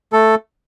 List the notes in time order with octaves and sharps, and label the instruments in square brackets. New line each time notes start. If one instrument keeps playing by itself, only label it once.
[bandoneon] A3 A4